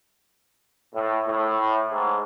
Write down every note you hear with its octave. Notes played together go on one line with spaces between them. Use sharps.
A2
A2
G#2